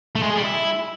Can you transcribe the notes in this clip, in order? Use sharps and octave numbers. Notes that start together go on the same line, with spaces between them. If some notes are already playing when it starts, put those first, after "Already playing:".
A3
G#3
G#4
G3
E4